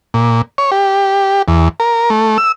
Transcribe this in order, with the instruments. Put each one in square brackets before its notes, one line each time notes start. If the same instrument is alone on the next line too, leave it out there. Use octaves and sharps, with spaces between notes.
[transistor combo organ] A#2
C#5
G4
E2
A#4
A3
E6